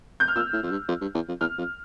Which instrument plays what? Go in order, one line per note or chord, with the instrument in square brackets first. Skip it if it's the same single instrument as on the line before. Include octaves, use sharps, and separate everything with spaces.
[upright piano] G6
F6
[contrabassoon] A#2 [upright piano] E6
[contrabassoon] A2
F2
G2
F2
G2
E2
F2
[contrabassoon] E2 [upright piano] F6
[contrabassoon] F2